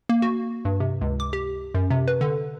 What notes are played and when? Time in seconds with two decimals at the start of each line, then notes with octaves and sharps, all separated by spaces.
0.09 A#3
0.22 F#4
0.65 G2
0.80 C3
1.01 C#2
1.20 D6
1.33 G4
1.75 F#2
1.90 C3
2.08 B4
2.21 D3